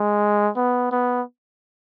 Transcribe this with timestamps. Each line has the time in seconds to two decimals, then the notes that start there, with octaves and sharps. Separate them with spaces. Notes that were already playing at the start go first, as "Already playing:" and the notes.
Already playing: G#3
0.56 B3
0.91 B3